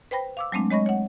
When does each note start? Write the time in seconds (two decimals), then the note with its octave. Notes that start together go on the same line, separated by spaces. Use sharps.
0.11 B4 C5 G5 B5 A#6
0.37 F5 D6 E6
0.52 F#3 G#3 A3 C4 D4
0.70 G#3 C#5 D#5 B5 C#6 A#6
0.86 C#5 F#5